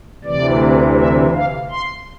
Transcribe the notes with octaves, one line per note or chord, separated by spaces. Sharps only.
D2 C3 E3 D5
E5
F5
C6